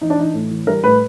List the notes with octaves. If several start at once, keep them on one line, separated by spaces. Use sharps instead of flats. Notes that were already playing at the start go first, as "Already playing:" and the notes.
E3 D#4
D4
E3 D#4
A2
E3
G3 A#4
A2 B4